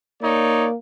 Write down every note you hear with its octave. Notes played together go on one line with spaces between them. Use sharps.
A#3 D#4 C#5 D5